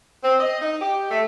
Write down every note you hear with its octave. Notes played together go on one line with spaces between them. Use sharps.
C4
D#5
D#4
G4
A3